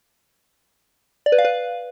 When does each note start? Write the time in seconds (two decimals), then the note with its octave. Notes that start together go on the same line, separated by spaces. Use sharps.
1.26 D5
1.32 B4
1.38 F5
1.45 B4